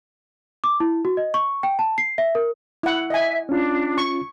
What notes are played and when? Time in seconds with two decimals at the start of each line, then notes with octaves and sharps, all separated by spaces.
0.64 D6
0.80 E4
1.05 F#4
1.17 D#5
1.34 C#6
1.63 G5
1.79 A5
1.98 C7
2.18 E5
2.35 A#4
2.83 E4 F#5
3.10 D#5 E5 G#5
3.49 C#4 D4 F4
3.98 C#6